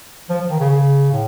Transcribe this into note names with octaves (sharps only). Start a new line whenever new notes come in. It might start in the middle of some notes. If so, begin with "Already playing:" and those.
F3
F3
D#3
C#3
C#3
A2